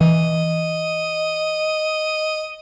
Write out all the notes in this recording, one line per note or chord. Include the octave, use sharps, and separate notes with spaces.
E3 D#5